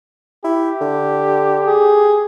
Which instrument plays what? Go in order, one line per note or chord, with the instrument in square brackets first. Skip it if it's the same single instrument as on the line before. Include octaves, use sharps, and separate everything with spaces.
[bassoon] E4 [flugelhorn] G4
[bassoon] D3
[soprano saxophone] G#4